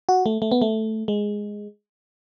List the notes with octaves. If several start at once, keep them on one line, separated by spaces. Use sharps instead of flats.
F#4
A3
A3
B3
A3
G#3